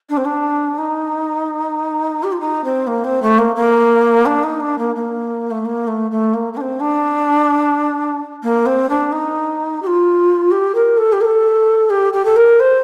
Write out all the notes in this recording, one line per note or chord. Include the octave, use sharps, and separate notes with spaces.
D4
C4
D4
D#4
G4
F4
D#4
C4
A#3
C4
A3
A#3
A#3
D4
D#4
D4
A#3
A#3
A3
A#3
A3
A3
A#3
A#3
D4
C4
D4
A#3
C4
D4
D#4
G4
F4
G4
A#4
A4
G4
A#4
A4
G4
G4
A4
A#4
C5